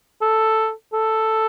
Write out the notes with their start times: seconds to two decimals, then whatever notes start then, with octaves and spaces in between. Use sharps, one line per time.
0.21 A4
0.93 A4